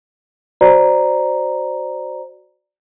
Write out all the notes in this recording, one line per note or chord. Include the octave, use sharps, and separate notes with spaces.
F#4 C5 D5 A#5